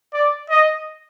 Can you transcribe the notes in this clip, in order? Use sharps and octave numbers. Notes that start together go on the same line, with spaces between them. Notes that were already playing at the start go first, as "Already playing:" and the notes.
D5
D#5